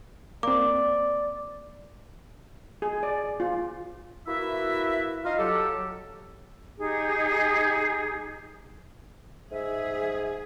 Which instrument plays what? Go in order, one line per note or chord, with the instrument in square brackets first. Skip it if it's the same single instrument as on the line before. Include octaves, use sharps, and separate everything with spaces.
[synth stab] A#3 C4 [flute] D5 [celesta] D6
[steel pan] G#4
D5
F4
[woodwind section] A#3 E4 F#4 B4 E5
D#4 F4 D#5 F5
F#3 G4 A4
[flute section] D#4 G4 G#4
[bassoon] G#2 [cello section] G#4 [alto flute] E5